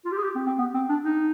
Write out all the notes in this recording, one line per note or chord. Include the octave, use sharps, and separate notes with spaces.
F4
G4
G#4
G4
C4
C4
B3
C4
D4
D#4